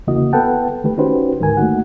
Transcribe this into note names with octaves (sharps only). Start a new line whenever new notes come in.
E2 C#3 A#3 E4 F#4 D#5
B3 A4 B4 F#5 G5 A5
D#3 A3 G4 B4
C#4 D#4 F#4 G4 B4 C5
D2 G#2 D#3 A#4 G#5
A3 A#3 D#4 F#4 F#5